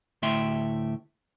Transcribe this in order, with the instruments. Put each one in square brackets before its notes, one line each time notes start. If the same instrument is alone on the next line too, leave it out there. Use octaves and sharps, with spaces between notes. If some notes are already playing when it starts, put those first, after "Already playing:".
[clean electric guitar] D2 A2 A3 E5 G5 C6